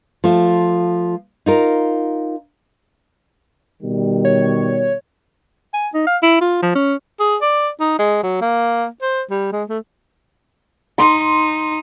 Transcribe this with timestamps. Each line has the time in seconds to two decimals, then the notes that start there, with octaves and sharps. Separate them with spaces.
0.24 F3 A3 F4
1.46 D#4 F4 A#4
3.82 B2 D#3 G3
4.25 C#5
5.73 G#5
5.94 D#4
6.07 F5
6.22 E4
6.41 F4
6.62 F3
6.75 C#4
7.20 G#4
7.42 D5
7.80 D#4
7.99 G#3
8.23 F#3
8.41 A#3
9.02 C5
9.31 G3
9.52 G#3
9.70 A3
10.98 D#4 C6